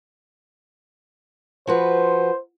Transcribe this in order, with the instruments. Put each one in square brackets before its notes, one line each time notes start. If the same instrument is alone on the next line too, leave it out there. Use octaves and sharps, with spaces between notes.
[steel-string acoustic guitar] F3 F#4 B4 [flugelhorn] C5